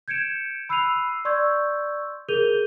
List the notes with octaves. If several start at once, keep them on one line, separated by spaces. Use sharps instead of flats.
G6 G#6 C#7 D7 E7
B5 E6 F#6 C7 D#7 F7
D5 C6 C#6 E6 G6 G#6
G#4 A#4 G6 D#7 F7 G7